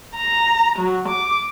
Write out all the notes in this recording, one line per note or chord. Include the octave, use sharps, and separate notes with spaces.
A#5
F#3
D6